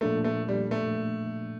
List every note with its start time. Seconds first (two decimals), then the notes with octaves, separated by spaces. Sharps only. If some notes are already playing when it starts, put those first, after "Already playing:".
0.01 A#2 F3 A3 A#3 D4 A4
0.24 A3
0.49 G3
0.71 A3